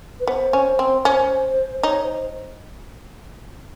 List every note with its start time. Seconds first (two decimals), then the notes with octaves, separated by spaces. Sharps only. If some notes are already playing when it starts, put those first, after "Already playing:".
0.20 B4
0.27 B3 C5
0.53 C#4
0.79 C4
1.05 C#4 C5
1.83 D#4 C#5
2.03 C5